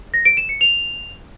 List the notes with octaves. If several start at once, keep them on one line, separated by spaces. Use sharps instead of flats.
A#6
D7
E7
C#7
F7